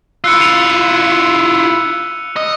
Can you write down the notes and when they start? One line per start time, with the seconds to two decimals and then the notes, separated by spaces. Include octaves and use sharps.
0.24 E4 F4 E6 F#6 C#7
0.39 C#7 D#7 F7
2.36 D#5